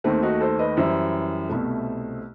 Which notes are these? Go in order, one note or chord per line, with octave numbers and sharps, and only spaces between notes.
D#2 D#3 A3 C4
D#4 F#4
A4 C5
B4 D#5
F#2 E3 G3 C5 E5
C2 B2 A3